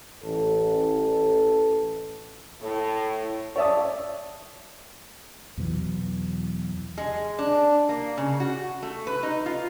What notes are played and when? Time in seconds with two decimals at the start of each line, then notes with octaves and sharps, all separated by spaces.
0.24 A1 A4
2.61 A2
3.56 C#5 D5 E5 A5 D#6
5.58 E2 B2 E3 F#3
6.98 G#3
7.39 D4
7.89 A#3
8.18 C#3
8.40 F#4
8.83 A3
9.07 B4
9.23 D#4
9.46 F4